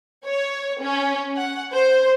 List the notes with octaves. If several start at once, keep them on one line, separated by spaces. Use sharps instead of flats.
C#5
C#4
F#5
C5